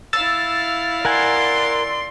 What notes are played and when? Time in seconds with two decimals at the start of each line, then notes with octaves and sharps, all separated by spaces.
0.13 E4 F5 E6 A6
1.05 A#4 D5 F#5 G#5 C6